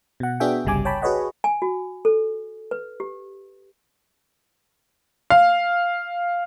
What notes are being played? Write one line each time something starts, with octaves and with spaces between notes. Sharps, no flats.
B2 F#5
B3 D4 F#4 G#4 E5 G5
G1 C2 C#3 G3 G#5 D6
C#5 G5 A5 B5
F#4 G#4 B4 C#5 D#5 F#5
G#5
F#4
A4
B4
G4
F5